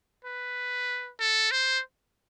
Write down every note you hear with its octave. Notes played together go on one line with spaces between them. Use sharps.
B4
A4
C5